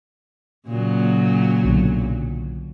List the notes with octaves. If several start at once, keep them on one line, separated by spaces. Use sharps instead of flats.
A#2 C#3 F#3
B1 D3